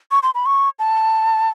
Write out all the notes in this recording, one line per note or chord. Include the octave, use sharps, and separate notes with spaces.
C#6
C6
B5
C#6
A5